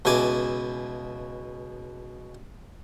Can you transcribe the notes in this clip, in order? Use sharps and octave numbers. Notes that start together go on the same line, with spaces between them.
C#2 B2 E4 G#5 D6